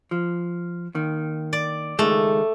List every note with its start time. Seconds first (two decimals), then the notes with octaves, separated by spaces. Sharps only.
0.11 F3
0.95 D#2 D#3
1.53 D5
1.99 C#2 D#3 G#3 A3